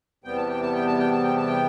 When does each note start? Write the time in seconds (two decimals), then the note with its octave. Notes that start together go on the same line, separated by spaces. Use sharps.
0.24 E2 C3 G3 B3 G5
0.36 A5
0.48 G5
0.61 A5
0.74 G5
0.86 A5
0.99 G5
1.11 A5
1.23 G5
1.36 A5
1.47 G5